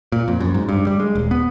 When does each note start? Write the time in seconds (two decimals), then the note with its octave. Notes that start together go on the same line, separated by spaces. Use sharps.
0.12 A#2
0.28 F2
0.40 F#2
0.54 G#2
0.69 G2
0.87 G3
1.00 G#3
1.15 D#1
1.31 B3